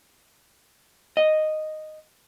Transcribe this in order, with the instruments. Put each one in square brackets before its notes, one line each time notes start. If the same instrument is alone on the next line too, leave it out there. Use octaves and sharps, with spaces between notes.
[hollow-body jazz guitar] D#5